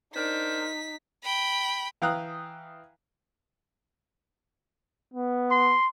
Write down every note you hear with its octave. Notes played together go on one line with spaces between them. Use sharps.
D4 D#4 A#4 C5 B6
G5 B5
E3 F5 G5 A#5 D#6 F#6
B3
C6